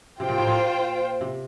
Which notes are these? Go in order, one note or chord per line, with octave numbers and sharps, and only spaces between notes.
C3 F4 C5 G5
A#2
A2
A#2
C3